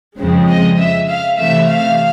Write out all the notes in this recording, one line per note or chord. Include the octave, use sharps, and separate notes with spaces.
F2 C#3 F3 G#3 C4
D#5
E5
F5
C3 E3 A3 E5
F5